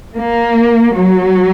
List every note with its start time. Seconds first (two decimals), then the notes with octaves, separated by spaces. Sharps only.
0.16 A#3
0.94 F#3